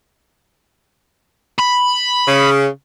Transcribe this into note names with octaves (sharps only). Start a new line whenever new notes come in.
B5
C#3